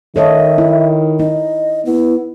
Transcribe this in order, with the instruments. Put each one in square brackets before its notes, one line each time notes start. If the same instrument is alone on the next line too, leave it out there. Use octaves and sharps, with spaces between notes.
[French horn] D#3 [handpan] A4 C#5 D#5 [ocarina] E5
[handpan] E4
[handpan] D#4 [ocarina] D#5
[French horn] B3 [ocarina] E4